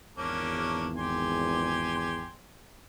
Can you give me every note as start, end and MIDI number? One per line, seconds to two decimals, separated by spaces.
0.18 2.27 32
0.18 2.27 40
0.18 0.88 58
0.18 0.88 61
0.18 0.88 62
0.97 2.31 67
0.97 2.31 80
0.97 2.31 84